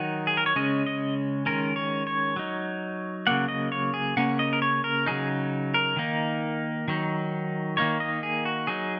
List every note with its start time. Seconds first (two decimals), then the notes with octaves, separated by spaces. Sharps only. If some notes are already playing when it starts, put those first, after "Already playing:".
Already playing: D#3 F#3 D#4 F#5
0.27 G#4
0.37 A#4
0.46 C#5
0.56 C#3 G#3 C#4 D#5
0.87 D#5
1.46 D#3 G#3 C#4 A#4
1.76 C#5
2.07 C#5
2.36 F#3 D#4
3.27 C#3 F#3 A#3 F#5
3.49 D#5
3.72 C#5
3.94 G#4
4.17 C#3 A#3 C#4 F#5
4.39 D#5
4.53 A#4
4.62 C#5
4.84 A#4
5.06 C#3 F#3 D#4 G#4
5.74 A#4
5.97 D#3 A#3 D#4
6.88 D#3 F#3 D#4
7.77 D#3 A#3 D#4 C#5
8.00 D#5
8.23 G#4
8.45 F#4
8.67 F#3 D#4 G#4